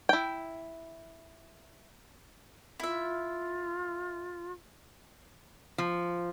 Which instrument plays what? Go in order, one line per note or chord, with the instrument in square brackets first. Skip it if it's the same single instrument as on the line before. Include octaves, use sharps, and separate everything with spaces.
[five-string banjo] E4 G5
[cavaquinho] E4 E5 [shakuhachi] F4
[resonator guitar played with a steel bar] F3